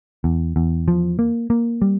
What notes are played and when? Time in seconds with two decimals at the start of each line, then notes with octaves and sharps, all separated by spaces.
0.24 E2
0.56 E2
0.88 F3
1.19 A#3
1.50 A#3
1.82 G3